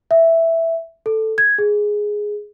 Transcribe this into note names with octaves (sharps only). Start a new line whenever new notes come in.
E5
A4
G#6
G#4